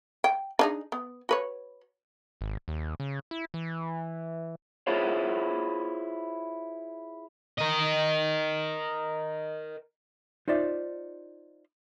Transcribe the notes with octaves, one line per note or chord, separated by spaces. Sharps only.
G5
D4 D#4 G#4
B3
F#4 B4 C#5
G#1
D#2
C#3
E4
E3
E4 F4 G#4 C5 C#5
A#4 D#5
D#4 F4 C5 D5 E5